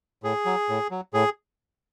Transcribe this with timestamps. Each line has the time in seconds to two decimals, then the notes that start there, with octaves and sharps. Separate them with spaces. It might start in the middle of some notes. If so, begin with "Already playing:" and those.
0.23 A2 G#4
0.46 F#3
0.69 A2
0.91 F#3
1.14 A2 G#4